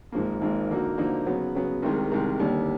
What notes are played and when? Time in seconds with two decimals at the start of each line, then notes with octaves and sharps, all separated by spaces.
0.12 G#1 G#2 F3 A#3
0.41 G#1 G#2 F3 A#3
0.69 D3 F3 A#3 D#4 F#4
0.97 D3 F3 A#3 D#4 F#4
1.26 C#3 F#3 B3
1.55 C#3 F#3 B3
1.82 C2 C3 D#3 G#3
2.12 C2 C3 D#3 G#3
2.40 D#2 D3 G3